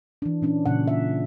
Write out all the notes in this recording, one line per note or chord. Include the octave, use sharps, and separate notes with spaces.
E3 D4
A#2 C#4 D4
A#2 C#3 F#5
E5